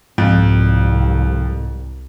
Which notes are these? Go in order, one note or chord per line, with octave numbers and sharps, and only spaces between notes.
C2 F2 G#2